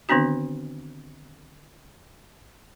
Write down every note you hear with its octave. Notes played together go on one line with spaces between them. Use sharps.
D3 D#3 B3 C4 D4 F#4